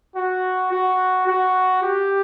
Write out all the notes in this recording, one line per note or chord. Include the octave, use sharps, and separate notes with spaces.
F#4
F#4
F#4
G4